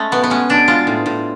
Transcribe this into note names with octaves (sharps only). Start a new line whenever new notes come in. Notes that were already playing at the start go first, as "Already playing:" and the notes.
Already playing: G#3 A3 C#4
B2 B3
B3
G#3 C#4
B2 D4
G#3 F4
A2
A2